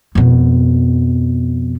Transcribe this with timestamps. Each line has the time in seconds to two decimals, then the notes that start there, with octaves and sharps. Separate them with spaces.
0.15 F2 B2